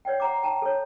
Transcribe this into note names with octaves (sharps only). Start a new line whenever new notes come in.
C#5 D5 F#5 G5
F#5 A#5 D6
G5 A5 A#5
A4 C#5